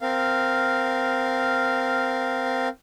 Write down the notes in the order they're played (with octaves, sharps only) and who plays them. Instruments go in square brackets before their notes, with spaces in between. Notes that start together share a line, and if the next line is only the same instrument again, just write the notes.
[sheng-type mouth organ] C4 A#4 F5